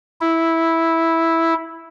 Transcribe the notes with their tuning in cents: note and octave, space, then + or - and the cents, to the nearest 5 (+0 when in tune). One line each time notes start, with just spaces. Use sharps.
E4 -5